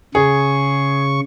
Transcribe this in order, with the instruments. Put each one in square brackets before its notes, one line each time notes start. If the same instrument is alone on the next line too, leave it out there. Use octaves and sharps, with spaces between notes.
[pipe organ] C#3 C#6 [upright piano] G#4